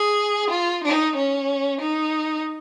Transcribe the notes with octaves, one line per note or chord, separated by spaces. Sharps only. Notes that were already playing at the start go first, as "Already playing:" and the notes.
Already playing: G#4
F4
D#4
C#4
D#4